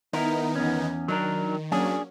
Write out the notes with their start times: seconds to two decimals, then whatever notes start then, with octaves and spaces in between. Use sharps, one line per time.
0.13 D#3 B3 D#4 E4 A#4
0.55 E2 C#4
1.08 D#3 F#3 D4 A#4
1.72 F#3 A#3 C#4 D4 G#4